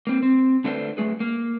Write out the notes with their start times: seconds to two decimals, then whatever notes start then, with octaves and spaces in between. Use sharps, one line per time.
0.07 A#3 C4
0.23 C4
0.64 D3 A3 D4 A4 B4 C5
0.97 F#2 F3 A3 G#4 B4
1.20 A#3